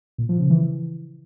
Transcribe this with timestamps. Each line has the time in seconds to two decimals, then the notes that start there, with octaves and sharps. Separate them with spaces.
0.18 A#2
0.29 F3
0.39 C#3
0.50 E3
0.60 E3